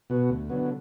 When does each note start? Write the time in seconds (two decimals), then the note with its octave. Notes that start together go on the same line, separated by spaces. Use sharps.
0.10 B2 B3 F#4
0.29 D2
0.49 D3 F#3 B3